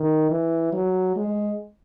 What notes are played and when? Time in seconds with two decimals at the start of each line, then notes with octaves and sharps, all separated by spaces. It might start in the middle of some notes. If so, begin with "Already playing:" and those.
Already playing: D#3
0.30 E3
0.73 F#3
1.16 G#3